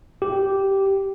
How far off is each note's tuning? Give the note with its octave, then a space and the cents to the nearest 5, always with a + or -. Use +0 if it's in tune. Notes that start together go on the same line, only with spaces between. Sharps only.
G4 -10